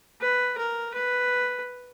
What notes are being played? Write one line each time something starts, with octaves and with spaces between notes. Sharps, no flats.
B4
A#4
B4